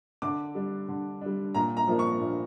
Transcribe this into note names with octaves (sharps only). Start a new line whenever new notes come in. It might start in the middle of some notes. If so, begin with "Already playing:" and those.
D3 D6
G3 D4
D3
G3 D4
A#2 A#5
A#5
F3 A#3 D4
C#6
A#2